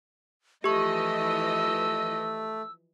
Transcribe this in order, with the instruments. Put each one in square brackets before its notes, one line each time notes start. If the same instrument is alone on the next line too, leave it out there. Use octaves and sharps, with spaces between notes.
[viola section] E3 F3 D#5 [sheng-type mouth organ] A3 [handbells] G4 C#6 [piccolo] E6